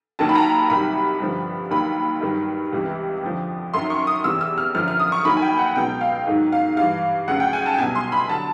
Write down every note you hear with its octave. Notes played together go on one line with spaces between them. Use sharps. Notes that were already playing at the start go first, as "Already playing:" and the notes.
D#2 D#3 F#3 A5
B5
A#5
C2 C3 D#3 F#3 B5
G2 D3 F3
D#2 D#3 F#3 B5
G2 D#3 F#3
C#2 C3 E3
F2 D3 F3
F#2 D#3 F#3 C6
C#6
D#6
E2 C3 E3 E6
E6
F6
F#2 D3 F3 F6
F6
D#6
C#6
D#2 D#3 F#3 B5
G#5
G5
F#5
C#2 B2 F#3 G5
F5
G#2 D#3 F#3
F5
G2 E3 F5
D2 C#3 F#3 F#5
G5
G#5
A5
G5
C2 B2 F#3 G#5
C6
B5
D3 F#3 A5